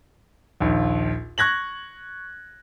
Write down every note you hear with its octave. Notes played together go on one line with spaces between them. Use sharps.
A#1 D#2
C#6 F#6 G#6 A#6 F#7